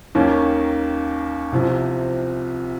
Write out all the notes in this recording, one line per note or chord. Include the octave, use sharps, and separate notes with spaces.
D#2 D#3 A#3 C#4
C2 C3 F3